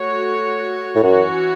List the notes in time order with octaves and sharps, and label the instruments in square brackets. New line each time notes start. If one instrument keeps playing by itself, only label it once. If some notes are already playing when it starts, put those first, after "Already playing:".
Already playing: [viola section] A3 F#4 C#5
[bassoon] A2
[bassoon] F#2 [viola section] E3 C#4 F#4 C#5